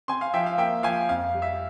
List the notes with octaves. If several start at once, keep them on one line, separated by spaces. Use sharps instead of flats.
C4 G#5 C6
F5
F3 E5 G5
F5
A#3 E5 G5
F3 F5 G#5
F2 F5
G3
E5